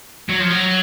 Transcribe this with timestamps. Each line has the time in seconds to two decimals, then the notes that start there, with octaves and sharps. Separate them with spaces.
0.29 F#3
0.40 F3
0.50 F#3